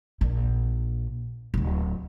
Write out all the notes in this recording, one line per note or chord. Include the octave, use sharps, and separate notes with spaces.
A#1 A#2
D1 G1